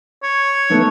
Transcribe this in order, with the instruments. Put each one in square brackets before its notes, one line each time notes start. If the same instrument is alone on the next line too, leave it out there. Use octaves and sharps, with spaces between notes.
[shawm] C#5
[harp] A3 B3 D#4